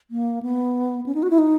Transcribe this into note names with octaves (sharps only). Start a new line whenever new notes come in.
A#3
B3
C#4
D#4
F#4
E4
D#4